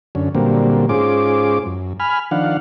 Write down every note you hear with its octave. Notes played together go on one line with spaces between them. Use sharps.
F#2 D3 C#4
A#2 D3 F#3 G3 A#3 C4
G#2 C#4 F4 G#4 C5 D6
F#2
G#5 B5 F6
D#3 F3 D4 F5 F#5